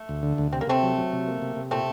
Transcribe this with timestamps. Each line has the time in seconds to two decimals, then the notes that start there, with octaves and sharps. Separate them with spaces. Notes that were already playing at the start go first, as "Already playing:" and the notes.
Already playing: A3
0.09 D2
0.23 D3
0.38 D2
0.52 C3 C4
0.61 A#3
0.67 C3 A3 C4
0.83 F#3
0.97 F#3
1.13 C3
1.27 A#3
1.42 C3
1.56 C3
1.71 A#2 A3 C4